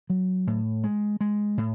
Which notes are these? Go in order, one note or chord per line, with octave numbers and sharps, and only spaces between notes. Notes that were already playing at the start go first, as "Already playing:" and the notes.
F#3
A2
G#3
G#3
A2